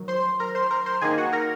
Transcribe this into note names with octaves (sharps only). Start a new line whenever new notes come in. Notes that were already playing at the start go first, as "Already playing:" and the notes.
Already playing: D#3 F#3
C5 C6
A#4 A#5
C5 C6
A#4 A#5
C5 C6
D#3 A#3 D#4 G#4 G#5
F#4 F#5
A#4 A#5